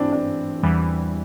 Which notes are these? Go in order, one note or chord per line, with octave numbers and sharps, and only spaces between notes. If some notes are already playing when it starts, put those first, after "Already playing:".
Already playing: G2 E3 A3 C4 D4 E4
D4
E2 E3 G3